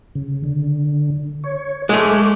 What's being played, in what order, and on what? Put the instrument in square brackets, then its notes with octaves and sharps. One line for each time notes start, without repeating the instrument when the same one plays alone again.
[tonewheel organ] C#3
D3
C#5
[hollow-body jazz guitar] G#3 A3 [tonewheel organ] A4 C#6 D6